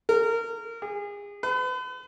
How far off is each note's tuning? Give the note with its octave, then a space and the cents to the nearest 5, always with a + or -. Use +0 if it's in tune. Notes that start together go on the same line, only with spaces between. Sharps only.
A#4 -25
G#4 -30
B4 +40